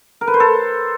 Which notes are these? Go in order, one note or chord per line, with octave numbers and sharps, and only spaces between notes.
A#4
B4
C5
A4